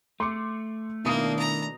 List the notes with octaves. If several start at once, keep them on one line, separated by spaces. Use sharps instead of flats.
A3 C6 D6 C#7
B2 D#3 A#3 D4 E4 D#6
A#5